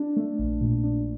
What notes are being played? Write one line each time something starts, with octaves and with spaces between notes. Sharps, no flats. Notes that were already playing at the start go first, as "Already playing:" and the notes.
Already playing: D4
A3
A#1
A#2
D4